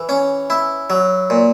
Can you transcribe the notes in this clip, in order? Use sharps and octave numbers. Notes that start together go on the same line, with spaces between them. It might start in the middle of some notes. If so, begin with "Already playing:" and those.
Already playing: E3
C#4
E4
F#3
A#2